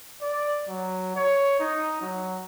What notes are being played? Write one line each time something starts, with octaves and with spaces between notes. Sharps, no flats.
D5
F#3
C#5
D#4
F#3